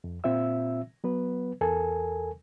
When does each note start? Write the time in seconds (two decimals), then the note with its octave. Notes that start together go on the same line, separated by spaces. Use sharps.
0.04 F2
0.24 A#2 C4 F4 E5 E6
1.04 F#3 B3 B4
1.61 E2 A4 A#4 G#5